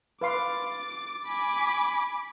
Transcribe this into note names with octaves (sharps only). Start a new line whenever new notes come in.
B4 F5 C6 D6 A6
G#5 B5 D6